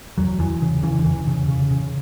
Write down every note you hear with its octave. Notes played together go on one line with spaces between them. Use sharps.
E2 F#3
E2 E3
C#3
C#3 E3
D3
E2 E3
C#3
C#3
C#3